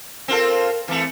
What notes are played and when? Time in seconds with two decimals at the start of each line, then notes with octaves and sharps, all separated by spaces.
0.28 C4 F4 A4 A#4
0.88 E3 A3 C4